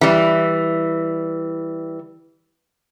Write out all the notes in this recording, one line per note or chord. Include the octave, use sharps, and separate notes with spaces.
E3 G3